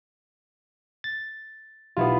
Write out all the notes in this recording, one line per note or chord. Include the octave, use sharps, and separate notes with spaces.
A6
B1 B3 E4 F4 G4